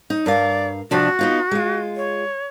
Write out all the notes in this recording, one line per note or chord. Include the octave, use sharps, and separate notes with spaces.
D#4
G2 A#4 D5 F5
C3 F3 D4 F#4
B3 D#4 F4
G#3 F4
C#5